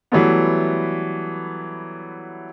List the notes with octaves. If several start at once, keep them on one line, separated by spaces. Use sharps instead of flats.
E3 F#3 G3 A3 B3